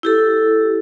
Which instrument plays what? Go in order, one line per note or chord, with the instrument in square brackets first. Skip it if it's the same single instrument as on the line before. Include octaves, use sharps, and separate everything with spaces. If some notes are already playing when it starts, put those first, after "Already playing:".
[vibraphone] E4 G4 A4